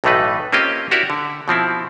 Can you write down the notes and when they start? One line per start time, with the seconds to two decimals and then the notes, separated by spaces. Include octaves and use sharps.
0.04 B1 A2 E3 A3 D#4 B4
0.52 A#3 C4 C#4 F4 G4 D#5
0.91 E4 F#4 G4 A#4 D5 E5
1.10 D3
1.48 B2 F3 C4 E4